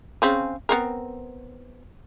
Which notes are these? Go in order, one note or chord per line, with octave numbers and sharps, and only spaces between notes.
C#3 C4 C#4
B3 C4 A#4